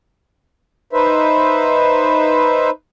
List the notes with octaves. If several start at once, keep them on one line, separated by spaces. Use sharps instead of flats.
D#4 B4 C5 E5